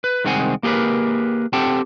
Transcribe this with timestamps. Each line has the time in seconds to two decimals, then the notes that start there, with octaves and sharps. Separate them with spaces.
0.04 B4
0.24 C2 D#3 G#3 C4 F#5 G#5
0.63 A#3 G4 G#4 A#4 B4
1.53 C4 G4 A4 F#5 G5 A5